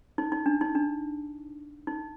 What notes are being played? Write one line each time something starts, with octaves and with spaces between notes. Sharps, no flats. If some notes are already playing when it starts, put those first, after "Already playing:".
D#4
D#4
D4
D#4
D4
D#4